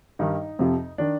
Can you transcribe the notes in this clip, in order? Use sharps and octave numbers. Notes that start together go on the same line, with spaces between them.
G2 D#3 D#4
F2 C3 F3
D#3 D4